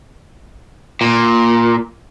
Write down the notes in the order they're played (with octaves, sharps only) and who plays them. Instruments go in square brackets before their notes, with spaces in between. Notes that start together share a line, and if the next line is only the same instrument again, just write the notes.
[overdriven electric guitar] A#2